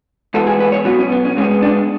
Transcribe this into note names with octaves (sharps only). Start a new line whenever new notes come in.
G#2 E3 B3 A4
G#4
B4
C#5
B2 F#3 B3 F#4
C#4
B3
C#4
G#2 G#3 B3 C#4
D4